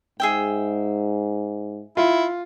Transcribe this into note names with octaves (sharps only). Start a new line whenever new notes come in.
G#2 G#4 E5 G5
E4 F4